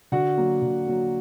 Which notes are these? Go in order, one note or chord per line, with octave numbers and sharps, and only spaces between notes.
D3 F#4 F#5
F#3 A#3
D3
F#3 A#3